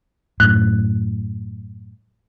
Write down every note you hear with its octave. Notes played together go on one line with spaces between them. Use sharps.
F#2 A2 F#6